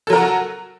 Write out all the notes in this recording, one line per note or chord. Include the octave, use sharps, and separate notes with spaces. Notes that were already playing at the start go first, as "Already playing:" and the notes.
F#3 F#4 A4 A#4